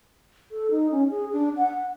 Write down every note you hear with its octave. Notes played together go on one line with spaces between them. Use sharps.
A4
D#4
C#4
G#4
D4
F#5